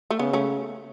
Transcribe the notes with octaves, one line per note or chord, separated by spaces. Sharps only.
A3
C#3 B3
A3 C#4